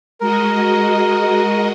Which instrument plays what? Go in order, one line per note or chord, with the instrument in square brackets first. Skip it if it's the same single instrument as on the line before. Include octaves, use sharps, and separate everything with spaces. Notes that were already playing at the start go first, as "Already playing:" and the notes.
[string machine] G#3 F#4 D#5 [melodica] A#4